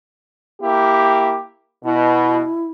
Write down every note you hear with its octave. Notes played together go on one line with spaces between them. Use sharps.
A#3 E4 G4
B2 E4